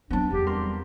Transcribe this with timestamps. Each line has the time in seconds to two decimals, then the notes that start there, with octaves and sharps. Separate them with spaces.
0.10 F#3 B3 C4 D4
0.31 E2 G4
0.47 F2 G3 A#4 C6